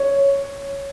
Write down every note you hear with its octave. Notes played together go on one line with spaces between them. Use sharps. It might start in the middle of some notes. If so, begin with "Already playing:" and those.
Already playing: C#5